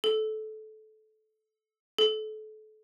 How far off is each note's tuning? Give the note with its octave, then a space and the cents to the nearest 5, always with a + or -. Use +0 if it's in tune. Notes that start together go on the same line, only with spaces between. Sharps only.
A4 -20
A4 -30